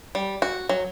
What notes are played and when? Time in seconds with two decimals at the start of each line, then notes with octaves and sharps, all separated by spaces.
0.15 G3
0.42 F#4
0.69 F#3